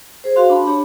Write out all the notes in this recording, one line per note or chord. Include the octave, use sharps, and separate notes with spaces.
G#4 C5
F#4 F5 C6
D4 A5 B5
D4 G4 C#5